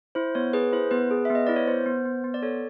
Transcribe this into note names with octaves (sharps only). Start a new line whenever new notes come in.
E4 C5
B3 C#5
G#4 B4
E4 C5
B3 B4
G#4
B3 E5
D#5
E4 D5
C#5
B3 C5
B3
B3
B3
D5
A4 C#5